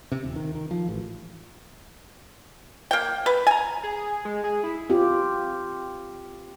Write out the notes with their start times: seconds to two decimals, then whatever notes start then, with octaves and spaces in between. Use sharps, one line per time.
0.12 C3
0.24 D#1
0.36 D#3
0.55 D#3
0.71 F3
0.89 A1
2.91 A#3 G5
3.26 B4
3.47 G#5 A#5
3.83 G#4
4.25 G#3
4.44 G#4
4.63 E4
4.90 C4 F4 G4